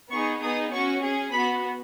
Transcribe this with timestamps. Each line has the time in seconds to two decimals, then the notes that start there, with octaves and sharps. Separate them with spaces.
0.11 B3 D#4 G#4 C#6
0.42 B3 D#4 G#4 D#6
0.72 C#4 F#4 C#6
1.02 C#4 G#4
1.32 B3 F#4 B5